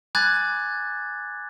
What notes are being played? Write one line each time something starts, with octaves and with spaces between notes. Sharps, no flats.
G#5 B5 D6 F#6 G#6 A6